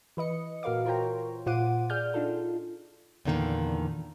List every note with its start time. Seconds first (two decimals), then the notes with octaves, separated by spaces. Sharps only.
0.17 E3 B4 D#5 C#7
0.63 A#2 F#4 A#4 B4 F5 D6
0.85 F4 A#4 C5 C#5 G5 A#5
1.46 A#2 F4 C5 F#5 D6 D#7
1.90 G#4 D5 F6 G6
2.14 D4 D#4 F4 A4
3.25 E2 A#2 D3 D#3 A3 A#3